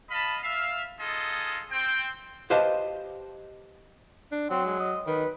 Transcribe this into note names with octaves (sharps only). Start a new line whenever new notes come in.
D#5 F5 A5 B5
E5 F5
D#4 F4 G#4 A4 D#5
C4 G5
G4 B4 C5 D#5 F5 A5
D4
F#3 C4
G#3
D#5
D#3 B4